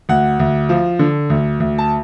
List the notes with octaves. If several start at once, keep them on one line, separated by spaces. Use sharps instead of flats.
D2 F#5
D2
F3
D3
D2
D2
A5